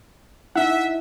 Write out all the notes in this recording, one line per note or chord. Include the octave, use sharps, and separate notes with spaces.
D#4 E4 E5 F#5